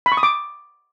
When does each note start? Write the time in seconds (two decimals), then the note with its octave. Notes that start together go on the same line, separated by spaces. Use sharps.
0.06 B5
0.12 C#6
0.17 D#6
0.23 D6